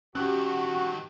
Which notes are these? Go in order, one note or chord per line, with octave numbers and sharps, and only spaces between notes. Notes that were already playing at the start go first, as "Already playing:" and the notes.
G2 D#3 C#4 F#4 G4 F#6